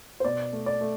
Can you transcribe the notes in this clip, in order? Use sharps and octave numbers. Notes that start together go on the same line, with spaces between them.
C5
B2 D5
A3
D5
A3